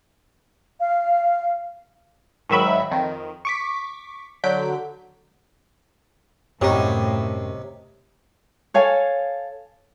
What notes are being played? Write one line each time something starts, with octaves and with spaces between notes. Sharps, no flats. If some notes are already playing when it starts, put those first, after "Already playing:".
F5
G#2 D#3 F#3 E5 B5
F2 D#3
C#6 D6 B6
D3 F#3 G6 B6 D7
F#2 A2 C3 D#4 G4 C#5
A4 C#5 F5 G#5